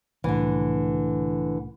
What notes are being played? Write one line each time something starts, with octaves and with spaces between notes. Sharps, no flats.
C2 A2 D3 E3